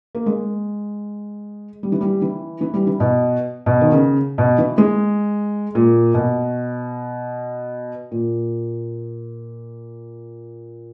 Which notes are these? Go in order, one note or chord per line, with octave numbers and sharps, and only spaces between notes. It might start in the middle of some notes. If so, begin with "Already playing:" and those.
A#3
G#3
G3
E3
G3
E3
E3
G3
E3
B2
B2
D#3
C#3
B2
E3
G#3
A#2
B2
A#2